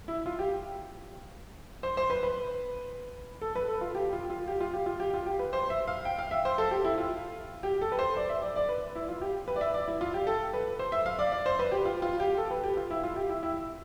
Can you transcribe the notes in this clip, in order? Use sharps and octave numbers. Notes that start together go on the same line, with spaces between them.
E4
F4
G4
C5
C5
B4
B4
A4
B4
A4
F4
G4
F4
F4
G4
F4
G4
F4
G4
F4
G4
B4
C5
E5
F5
G5
F5
E5
C5
A4
G4
E4
F4
G4
A4
B4
C5
D5
E5
D5
D5
B4
E4
F4
G4
B4
D5
E5
D5
E4
F4
G4
A4
B4
C5
E5
F5
D5
D5
C5
B4
G4
F4
F4
G4
A4
B4
G4
F4
E4
F4
G4
E4
E4